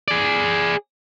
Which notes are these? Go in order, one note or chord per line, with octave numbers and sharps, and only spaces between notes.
G#4 D5